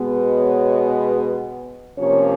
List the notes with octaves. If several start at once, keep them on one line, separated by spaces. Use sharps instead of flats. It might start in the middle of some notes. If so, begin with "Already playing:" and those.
Already playing: B2 G#3 B3
C#5
C3 F3 A#3 C#4 C#5